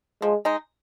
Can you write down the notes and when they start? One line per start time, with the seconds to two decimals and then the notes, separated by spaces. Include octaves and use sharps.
0.22 F3 G#3
0.45 G#3 D#4